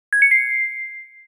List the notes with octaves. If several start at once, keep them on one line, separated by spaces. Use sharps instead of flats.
G#6
C#7
C7